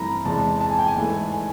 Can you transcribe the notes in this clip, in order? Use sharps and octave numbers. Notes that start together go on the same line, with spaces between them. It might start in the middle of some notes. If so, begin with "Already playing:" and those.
Already playing: G2 E3 A3 C4 A#5 B5
E2 C3 E3 G#3 A5
A5
G#5
G5
G#5
G#2 E3 A3
G#5